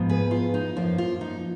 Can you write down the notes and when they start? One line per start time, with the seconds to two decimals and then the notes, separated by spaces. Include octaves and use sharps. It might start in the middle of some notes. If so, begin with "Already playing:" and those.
Already playing: G#2 F3 B3
0.09 G#4 B4
0.31 F4
0.54 D#4
0.76 F#2 F3 A#3 F4
0.98 F4
1.21 D#4